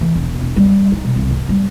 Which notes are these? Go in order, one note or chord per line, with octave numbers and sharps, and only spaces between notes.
E3
E1
E1
G3
D#4
B2
C2
G#2
G3